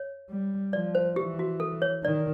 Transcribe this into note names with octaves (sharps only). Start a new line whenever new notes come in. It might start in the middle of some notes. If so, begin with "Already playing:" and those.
Already playing: C#5
G3
F3 D5
C5
E3 G4
F#4
A4
C#5
D#3 D5